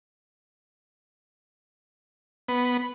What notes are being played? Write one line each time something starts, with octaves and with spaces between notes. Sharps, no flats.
B3